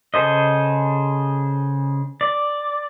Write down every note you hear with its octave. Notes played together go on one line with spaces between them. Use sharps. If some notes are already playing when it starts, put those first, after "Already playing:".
C#3 G#4 A4 C5 D#5
D5